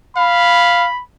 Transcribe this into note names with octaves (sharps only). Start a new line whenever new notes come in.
F5 B5